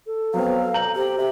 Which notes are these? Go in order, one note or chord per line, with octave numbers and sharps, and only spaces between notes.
A4
F#3 B3 C4 F5
A#5 G6 F#7
G4 C5
G4 E5